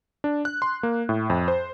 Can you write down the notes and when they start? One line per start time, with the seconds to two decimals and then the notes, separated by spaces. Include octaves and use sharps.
0.24 D4
0.45 F#6
0.62 C6
0.83 A#3
1.09 A2
1.30 F2
1.48 C5